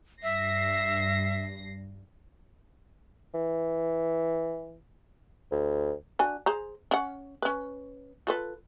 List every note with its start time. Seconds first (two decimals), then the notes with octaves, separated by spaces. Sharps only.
0.23 G2 E5 A#6 C7
3.34 E3
5.51 D2
6.19 D4 F#4 G#5
6.46 G#4 C5 A#5
6.91 C#4 F#5
7.42 C#4 B4
8.27 F4 A4 B4